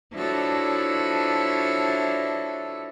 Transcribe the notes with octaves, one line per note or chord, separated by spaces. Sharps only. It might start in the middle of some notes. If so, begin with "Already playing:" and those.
F3 D4 E4 F#4 A4 C#5